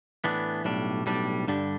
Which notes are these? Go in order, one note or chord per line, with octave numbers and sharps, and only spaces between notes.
A2 E3 B3 D4
B1 A2 G3 D4
B1 A2 G3 D4
G2 D3 G3 D4